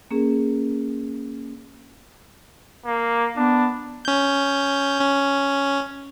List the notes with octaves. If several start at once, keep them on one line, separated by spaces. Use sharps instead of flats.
A#3 C#4 G#4 A#4
A#3
B3 D4
C#4 G6
C#4